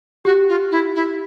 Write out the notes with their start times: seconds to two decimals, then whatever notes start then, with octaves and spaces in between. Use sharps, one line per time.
0.25 F#4 G4
0.48 F4
0.71 E4
0.95 E4